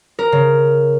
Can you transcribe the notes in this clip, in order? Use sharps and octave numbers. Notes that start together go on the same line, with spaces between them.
A#4
C#3